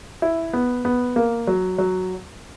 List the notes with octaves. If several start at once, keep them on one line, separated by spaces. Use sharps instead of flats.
E4
B3
B3
A#3
F#3
F#3